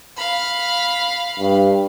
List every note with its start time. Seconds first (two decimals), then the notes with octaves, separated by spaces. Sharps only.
0.17 F5 B5
1.39 G2